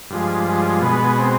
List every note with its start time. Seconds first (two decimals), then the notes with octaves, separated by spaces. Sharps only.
0.10 G2 F3 G#3
0.47 G#3
0.82 B2 G#3 B3
1.18 C4